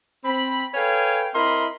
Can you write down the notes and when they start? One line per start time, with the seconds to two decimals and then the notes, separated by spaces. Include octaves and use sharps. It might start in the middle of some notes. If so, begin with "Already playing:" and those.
0.25 C4 B5
0.74 A4 B4 C#5 F5 G5 G#5
1.35 C4 E4 A#4 D#5 B5 C6